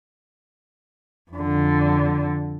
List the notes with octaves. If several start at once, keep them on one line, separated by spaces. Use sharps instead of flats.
F2 D3